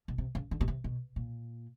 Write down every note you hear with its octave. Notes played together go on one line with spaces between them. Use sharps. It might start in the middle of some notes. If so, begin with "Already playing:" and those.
B2
C3
C#3
D3
B2
C3
B2
A#2